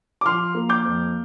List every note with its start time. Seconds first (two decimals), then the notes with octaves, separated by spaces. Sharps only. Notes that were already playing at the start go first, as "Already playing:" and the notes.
0.21 D6
0.25 F3 C6 F6
0.55 A#3
0.69 D6 G6
0.85 F2